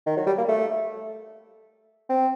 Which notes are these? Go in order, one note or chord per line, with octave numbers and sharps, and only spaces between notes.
D#3
F#3
G3
A#3
A3
C4